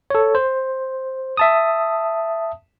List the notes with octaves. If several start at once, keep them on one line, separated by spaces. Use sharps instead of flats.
A4 C#5
C5
E5 A5 D#6